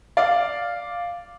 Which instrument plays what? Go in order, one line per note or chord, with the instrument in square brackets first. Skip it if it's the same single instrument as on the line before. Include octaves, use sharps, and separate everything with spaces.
[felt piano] D5 F5 D6